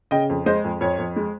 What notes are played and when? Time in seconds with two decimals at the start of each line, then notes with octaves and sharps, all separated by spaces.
0.11 C#3 D#5 G5
0.29 F2
0.46 G#3 C5 D#5
0.64 F2
0.81 F2 C#5
0.98 F2
1.16 G#3